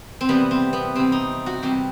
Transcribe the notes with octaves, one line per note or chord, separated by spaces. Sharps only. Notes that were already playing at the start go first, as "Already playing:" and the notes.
C4
C3 E3 G3 B3
C4
B3
C3 E3 G3 C4
D#4
F#4
C3 E3 G3 G4